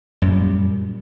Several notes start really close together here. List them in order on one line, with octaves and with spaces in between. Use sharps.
F#2 A#2 G3